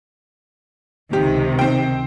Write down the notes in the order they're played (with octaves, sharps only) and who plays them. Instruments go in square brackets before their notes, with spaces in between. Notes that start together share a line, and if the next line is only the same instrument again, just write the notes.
[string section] C#2 C3 D#3 [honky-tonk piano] G4
[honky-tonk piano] C4 G5